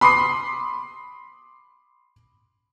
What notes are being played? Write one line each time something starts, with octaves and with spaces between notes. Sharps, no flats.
B5 C6 D6 D#6 C7